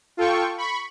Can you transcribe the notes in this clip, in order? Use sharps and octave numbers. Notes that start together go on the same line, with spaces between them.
F4 A4 G5 C#6
B5 C#6